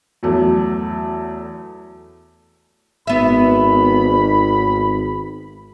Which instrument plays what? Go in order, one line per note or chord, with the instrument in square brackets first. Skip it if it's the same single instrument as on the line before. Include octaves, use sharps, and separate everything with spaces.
[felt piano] E2 F#3 A3
[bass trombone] G#1 [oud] B3 E5 [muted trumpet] B5